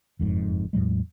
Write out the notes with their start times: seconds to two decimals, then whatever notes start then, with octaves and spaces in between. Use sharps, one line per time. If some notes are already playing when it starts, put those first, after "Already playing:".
0.19 F#1 F2 G#2
0.73 E2 A2 F#3 G#3